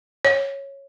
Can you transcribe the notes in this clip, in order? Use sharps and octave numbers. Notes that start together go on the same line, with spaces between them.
C#5